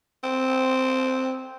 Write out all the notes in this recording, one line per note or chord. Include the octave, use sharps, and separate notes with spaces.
C4